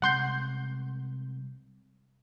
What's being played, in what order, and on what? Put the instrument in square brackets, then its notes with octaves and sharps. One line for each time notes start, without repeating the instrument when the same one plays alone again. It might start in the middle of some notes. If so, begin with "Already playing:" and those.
[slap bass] C3 G3 G#3 [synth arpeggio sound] F#5 C6 G6